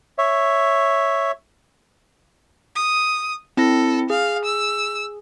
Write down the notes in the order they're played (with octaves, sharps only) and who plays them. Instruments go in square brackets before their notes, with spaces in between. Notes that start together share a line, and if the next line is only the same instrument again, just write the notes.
[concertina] C#5 E5
[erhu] D#6
[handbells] C4 E4 A#6 [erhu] A4
[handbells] G#4 [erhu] F5
[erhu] E6